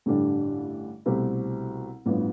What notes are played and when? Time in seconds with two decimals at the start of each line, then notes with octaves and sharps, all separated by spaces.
0.06 A1 G2 D3 G3 D4
1.06 C2 B2 A3 C4 G4
2.06 A1 G2 F3 B3